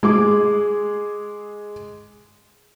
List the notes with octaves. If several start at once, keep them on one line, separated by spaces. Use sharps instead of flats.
G#3 G#4 D6